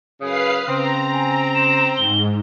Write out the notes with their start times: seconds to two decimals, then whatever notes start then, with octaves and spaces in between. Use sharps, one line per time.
0.21 F#2 C#3 G#4 B4 F5 D#6 C7
0.68 C#3 C4 A#5
1.13 G#5
1.55 E7
1.97 G#2 G7